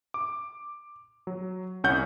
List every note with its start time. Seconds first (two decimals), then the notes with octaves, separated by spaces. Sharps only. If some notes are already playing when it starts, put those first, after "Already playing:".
0.14 D6
1.27 F#3
1.84 C2 C#4 C#5 F#5 G6